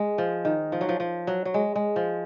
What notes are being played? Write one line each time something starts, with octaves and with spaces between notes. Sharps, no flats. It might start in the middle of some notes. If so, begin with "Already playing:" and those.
Already playing: G#3
F3
D#3
F3
F#3
F3
F3
F#3
F#3
G#3
G#3
F3